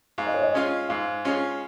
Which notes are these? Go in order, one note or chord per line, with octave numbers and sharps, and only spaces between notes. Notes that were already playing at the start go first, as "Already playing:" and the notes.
G#2 F5
D#5
C#5
D#5
G#3 C#4 F4
G#2 F5
G#3 C#4 F4